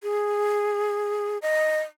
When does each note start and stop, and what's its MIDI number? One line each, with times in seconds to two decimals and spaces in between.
0.03 1.38 68
1.42 1.81 75